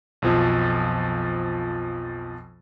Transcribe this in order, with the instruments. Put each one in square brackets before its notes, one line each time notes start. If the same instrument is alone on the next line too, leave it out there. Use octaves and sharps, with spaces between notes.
[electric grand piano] B1 F2 F3